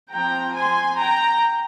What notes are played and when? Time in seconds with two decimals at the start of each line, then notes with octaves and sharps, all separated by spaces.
0.12 F3 C4 G5 A#5
0.56 G#5 C6
1.00 G5 A#5